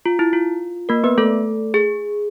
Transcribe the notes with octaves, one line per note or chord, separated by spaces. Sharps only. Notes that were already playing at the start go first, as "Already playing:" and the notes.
F4
E4
F4
A#3 A#4
B3 B4
A3 A4
G#4